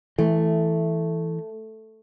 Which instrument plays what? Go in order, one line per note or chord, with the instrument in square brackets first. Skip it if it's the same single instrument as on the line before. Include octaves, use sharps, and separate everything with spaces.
[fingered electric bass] E3 [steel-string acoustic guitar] A3